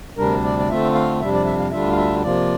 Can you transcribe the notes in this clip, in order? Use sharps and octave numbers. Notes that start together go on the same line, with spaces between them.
D2 C3 G3 D4 A#4
D5
D5
D3 A3 C4 F4 E5
F5
F2 C3 G3 D4 E5
D5
E5
F5
D2 D3 G3 D4 F4 E5
F5
E5
C3 F3 A#3 F4 D5